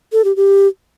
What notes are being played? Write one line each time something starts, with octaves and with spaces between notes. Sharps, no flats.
A4
G4
G4